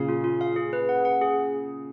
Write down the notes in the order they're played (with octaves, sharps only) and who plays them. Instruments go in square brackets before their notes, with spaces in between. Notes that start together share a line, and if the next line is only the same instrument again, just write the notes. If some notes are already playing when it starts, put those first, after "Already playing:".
Already playing: [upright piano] A#2 C#3 [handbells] F5
[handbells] F4
F4
F5
G#4
B4
F#5
F#5
G#4